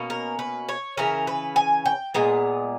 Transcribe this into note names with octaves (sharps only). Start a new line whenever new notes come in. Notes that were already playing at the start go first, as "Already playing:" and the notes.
Already playing: B2 A#3 C#4
A#4
B4
C#5
C#3 E3 C#4 A#4
B4
G#5
G5
A#2 G#3 B3 A#4